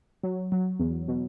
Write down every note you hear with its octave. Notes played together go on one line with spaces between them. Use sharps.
F#3
F#3
E2
B2